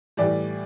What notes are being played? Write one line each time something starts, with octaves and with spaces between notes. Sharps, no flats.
A2 E3 G3 D5